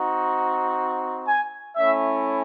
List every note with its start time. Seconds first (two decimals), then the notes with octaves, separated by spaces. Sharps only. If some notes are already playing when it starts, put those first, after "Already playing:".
Already playing: C4 D#4 F#4
1.26 G#5
1.76 A3 C#4 E4 E5